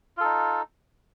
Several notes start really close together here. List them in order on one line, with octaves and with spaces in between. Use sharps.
F4 A4 D#4